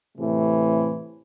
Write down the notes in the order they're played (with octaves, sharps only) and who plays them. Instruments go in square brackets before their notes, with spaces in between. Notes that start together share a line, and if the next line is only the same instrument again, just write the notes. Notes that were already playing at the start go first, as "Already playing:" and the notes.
[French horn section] A2 C3 E3 A3